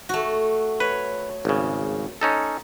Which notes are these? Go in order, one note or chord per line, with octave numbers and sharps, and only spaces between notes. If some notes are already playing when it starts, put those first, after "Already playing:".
A3 F#4
B4 C#5
G#1 C#3
C#4 D#4 A4